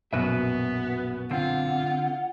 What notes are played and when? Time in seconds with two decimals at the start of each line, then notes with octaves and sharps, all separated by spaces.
0.13 A#1 F#2 B2 B3 F#4 B4 E5
1.31 D3 C4 F4 F#5